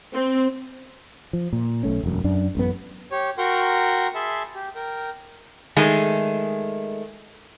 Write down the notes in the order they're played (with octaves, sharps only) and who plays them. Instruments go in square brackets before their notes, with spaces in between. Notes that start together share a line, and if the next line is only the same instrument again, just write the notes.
[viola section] C4
[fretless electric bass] F3
A#2
B1 A3 C#4
E1 F#2
F#2 D4
A1 F#2 B3
[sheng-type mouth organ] G4 C#5
F#4 A#4 G5 A#5 C6 C#6
G#4 E5 A5 B5 C6
G4
A#4 G5
[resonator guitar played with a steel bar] D#3 G#3 A3